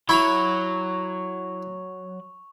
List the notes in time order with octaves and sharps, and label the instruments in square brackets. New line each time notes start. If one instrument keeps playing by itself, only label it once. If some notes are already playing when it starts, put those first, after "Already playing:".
[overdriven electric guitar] F#3 [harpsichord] E4 B5 [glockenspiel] C#6 F7